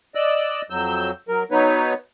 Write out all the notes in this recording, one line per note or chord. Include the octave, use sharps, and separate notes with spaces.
D5 D#5 E6 F#6
F2 F#3 E6 G6
F#3 A#4
F#3 B3 D#4 B4 C#5